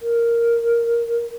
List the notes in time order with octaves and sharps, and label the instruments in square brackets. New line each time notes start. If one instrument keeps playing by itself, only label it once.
[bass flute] A#4